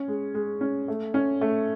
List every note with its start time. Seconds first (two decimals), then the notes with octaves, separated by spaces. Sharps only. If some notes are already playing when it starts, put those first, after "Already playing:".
Already playing: C#4
0.08 G#3
0.34 G#3
0.61 C#4
0.88 A3
1.14 C#4
1.41 A3